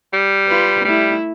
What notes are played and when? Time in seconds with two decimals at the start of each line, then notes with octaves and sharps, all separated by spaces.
0.13 G3
0.48 F4 B4
0.85 G3 A3 E4